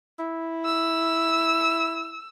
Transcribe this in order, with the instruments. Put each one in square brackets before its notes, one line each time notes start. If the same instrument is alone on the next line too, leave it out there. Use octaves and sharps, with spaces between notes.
[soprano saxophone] E4
[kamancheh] E6